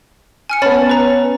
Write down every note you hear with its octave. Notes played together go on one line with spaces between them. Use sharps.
G#5 F6 C#7
B3 C#4 A5 B5 A6
B4 A#5